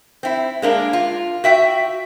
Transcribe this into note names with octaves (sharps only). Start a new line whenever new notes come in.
C4 E4
G#3 A#3 D4
F4
F#4 E5 G5